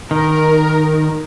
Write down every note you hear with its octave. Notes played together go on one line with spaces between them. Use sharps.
D#3 A#4